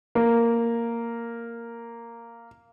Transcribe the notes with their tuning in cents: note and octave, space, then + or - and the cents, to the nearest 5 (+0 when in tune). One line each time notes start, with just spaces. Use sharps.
A#3 -5